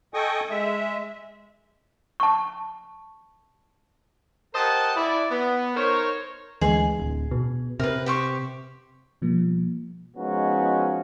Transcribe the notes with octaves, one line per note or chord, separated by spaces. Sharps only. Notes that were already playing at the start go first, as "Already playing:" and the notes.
A4 D#5 G5 G#5 C#6 D#6
G#3 E5
A5 C#6
G4 A#4 C5 D#5 F#5 A5
E4 D5
B3
D#4 A#4 C5 C#5
D2 E3 G#3 G#4
D1
B2
C3 A#4 B4
G4 C5 C#6
B2 F3 G3 A#3
F3 G#3 B3 C#4 D#4 F#4